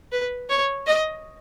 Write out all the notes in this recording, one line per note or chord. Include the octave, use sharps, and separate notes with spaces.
B4
C#5
D#5